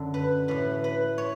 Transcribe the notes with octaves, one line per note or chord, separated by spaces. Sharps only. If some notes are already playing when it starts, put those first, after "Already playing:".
Already playing: F#2 D3
B4
A2 E3 B4
B4
C#5